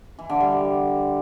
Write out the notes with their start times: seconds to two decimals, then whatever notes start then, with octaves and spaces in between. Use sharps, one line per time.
0.19 E3
0.29 D3
0.40 G3